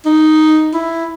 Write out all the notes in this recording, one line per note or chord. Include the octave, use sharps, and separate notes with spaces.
D#4
E4